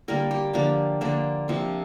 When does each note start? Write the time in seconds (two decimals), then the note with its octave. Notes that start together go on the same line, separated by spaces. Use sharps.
0.08 D3 G3 A#3 A#4
0.31 G4
0.53 D3 F3 A#3 D4
1.01 D3 A#3 D4
1.48 C3 F3 A#3